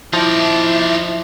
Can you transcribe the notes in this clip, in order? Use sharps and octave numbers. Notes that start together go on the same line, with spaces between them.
F3 D#4 E4 D5 E5